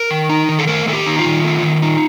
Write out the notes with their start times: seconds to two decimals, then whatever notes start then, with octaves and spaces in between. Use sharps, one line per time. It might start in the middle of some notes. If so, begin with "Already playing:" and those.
Already playing: A#4
0.10 D#3
0.29 D#4
0.49 D#3
0.59 A4
0.67 A3 A#4
0.87 D#3 A4
0.93 G4
1.06 D#4
1.19 F4
1.25 D#3
1.44 A3
1.63 D#3
1.82 D#4